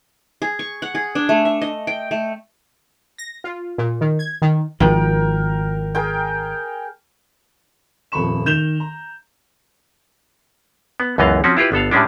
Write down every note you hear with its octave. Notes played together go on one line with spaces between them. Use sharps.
G#4
C#6
F#5
G#4
D4
A3
E5
D#5
G5
A3
A#6
F4
A#2
D#3
G#6
D#3
G#1 F3 A#4 G5
G#4 A#4 G5
D#1 F2 A4 B5 C#6 E7
D#3 G6 E7 F7 G7
A#5
B3
C#2 F#2 E3 B3 D#5 F5
F3 C4 C#4 F#4
E4 F4 G4 B4
G1 B3 A4 F5
A2 G3 G#3 C#4 D4